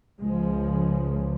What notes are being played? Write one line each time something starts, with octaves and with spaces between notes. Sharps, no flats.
C#2 C#3 F3 G#3